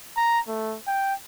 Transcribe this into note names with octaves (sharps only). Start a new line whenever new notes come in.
A#5
A3
G5